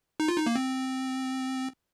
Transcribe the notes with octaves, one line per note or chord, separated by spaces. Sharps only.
D#4
F4
D#4
A#3
C4